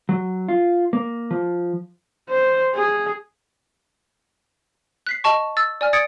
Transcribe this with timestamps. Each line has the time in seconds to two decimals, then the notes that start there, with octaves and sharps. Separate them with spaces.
0.09 F#3
0.49 F4
0.93 A#3
1.31 F3
2.30 C5
2.75 G#4
5.07 F#6 B6 C7
5.24 D#5 A5 C#6
5.57 E6 A6
5.81 D5 G#5 F6
5.93 D#6 G#6 A6 C#7 D7